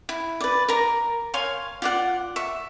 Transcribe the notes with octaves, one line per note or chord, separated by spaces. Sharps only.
E4
B4 D5
A#4 A#5
C#5 F5 G#5 C6
F4 D5 F#5
E5 C#6